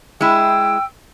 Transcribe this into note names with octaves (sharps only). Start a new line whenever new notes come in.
G#3 E4 G5 E6